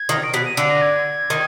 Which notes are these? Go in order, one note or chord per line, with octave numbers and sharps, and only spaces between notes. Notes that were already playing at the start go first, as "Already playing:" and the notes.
Already playing: G#6
D#3
D7
B2 B6
D#7
D3 D7
A#6
G#6
D#3